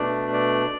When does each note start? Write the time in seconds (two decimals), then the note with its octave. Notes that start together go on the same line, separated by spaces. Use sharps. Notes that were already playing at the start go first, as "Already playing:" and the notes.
Already playing: B2 A3 D4 D5
0.33 D5